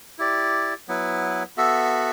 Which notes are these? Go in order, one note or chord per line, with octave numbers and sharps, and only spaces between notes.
E4 G4 D5
F#3 B3 E4 B4
B3 F#4 A4 E5